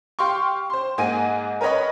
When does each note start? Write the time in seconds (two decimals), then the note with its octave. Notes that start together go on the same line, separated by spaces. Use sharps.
0.19 G4 F5 C6 C#6
0.70 C5 C6
0.98 G#2 A#3 G#5 D#7
1.61 A#4 B4 C#5 D#5 B5